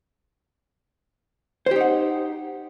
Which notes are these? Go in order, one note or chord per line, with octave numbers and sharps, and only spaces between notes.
D#4 G4 C5 F#5